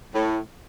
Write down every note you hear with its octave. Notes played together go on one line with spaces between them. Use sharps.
A2